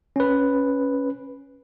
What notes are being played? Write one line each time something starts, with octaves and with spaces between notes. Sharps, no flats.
C#4 B4